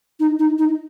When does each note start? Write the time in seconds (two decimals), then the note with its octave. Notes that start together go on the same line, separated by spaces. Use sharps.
0.19 D#4
0.39 D#4
0.58 D#4